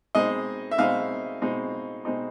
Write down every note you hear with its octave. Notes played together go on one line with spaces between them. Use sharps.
B2 G#3 C4 D#4 D#5
E5
B2 G#3 C4 D#4 F5
B2 G#3 C4 D#4
B2 G#3 C4 D#4